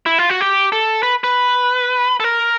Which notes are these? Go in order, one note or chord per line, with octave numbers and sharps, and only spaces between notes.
E4
F4
F#4
G4
A4
B4
B4
A4
A#4